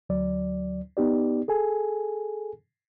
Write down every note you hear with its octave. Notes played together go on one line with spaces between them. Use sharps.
D2 F#3 D5
B3 D#4 G4 D5
G#4 A4 G#5